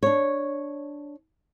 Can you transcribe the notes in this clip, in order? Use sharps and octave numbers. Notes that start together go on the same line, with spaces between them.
D4 C#5